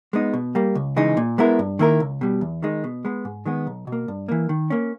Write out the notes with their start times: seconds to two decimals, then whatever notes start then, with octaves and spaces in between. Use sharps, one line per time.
0.13 G#3 B3 D#4
0.33 B2
0.55 G3 A#3
0.75 C#2
0.96 C#3 E3 G#3 D#4
1.17 A#2
1.38 G#3 B3 E4 A#4
1.59 G2
1.79 D#3 A#3 E4 A#4
2.00 C#2
2.21 B2 G3
2.41 E2
2.63 D#3 G#3 D#4
2.84 B2
3.05 G#3 B3
3.25 G#2
3.45 D#3 G#3 B3
3.67 B1
3.87 B2
3.92 A#3
4.08 G2
4.28 E3 A#3
4.49 D#3
4.70 A#3 C#4